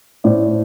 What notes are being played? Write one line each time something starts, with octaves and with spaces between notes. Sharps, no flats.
A2 C5 D5